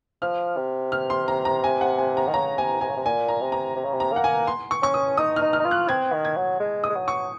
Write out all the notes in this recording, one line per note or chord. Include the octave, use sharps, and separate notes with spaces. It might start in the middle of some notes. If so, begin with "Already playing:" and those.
F3 F6
C3
F6
C6
A#5
A#5
G#5
F#5
G#5
A#5
D#3
C#3 A#5
C3 G#5
C3 G#5
C#3
C3
A#2 G#5
A#5
C3
A#5
C3
C#3
C3
A#5
A#3 F#5
G#5
C6
C#6
C#4 C#6
D#6
D#4 D#6
F6
D#4
F6
D#4
F4
F#6
C4 G#6
D#3
G#6
F#3
G#3
D#6
G#3
F#3
C#6